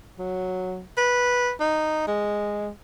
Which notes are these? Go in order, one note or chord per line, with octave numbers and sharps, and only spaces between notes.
F#3
B4
D#4
G#3